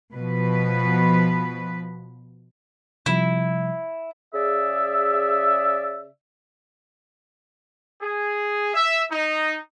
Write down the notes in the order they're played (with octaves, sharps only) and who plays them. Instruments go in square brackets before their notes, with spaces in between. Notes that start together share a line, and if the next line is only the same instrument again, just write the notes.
[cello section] B2 F3 B4
[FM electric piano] C3 F3 G3 [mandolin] E4
[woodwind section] C#3 G#4 D5 E5
[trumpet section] G#4
E5
D#4